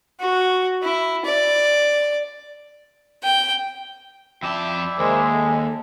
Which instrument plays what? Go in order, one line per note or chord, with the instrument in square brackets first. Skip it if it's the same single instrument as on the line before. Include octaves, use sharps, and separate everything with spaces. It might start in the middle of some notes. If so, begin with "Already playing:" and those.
[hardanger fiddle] F#4
E4
D5
[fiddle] G5
[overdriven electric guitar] F2 A5 [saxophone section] E4 D5 E5 [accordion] G5
[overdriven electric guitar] D#2 [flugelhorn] G#3 [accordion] A#4 C5
[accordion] A4